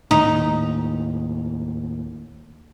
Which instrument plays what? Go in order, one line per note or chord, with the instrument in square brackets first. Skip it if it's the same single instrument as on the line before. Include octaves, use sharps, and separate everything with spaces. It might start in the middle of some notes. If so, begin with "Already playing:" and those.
[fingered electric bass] D#2 A2 [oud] D#4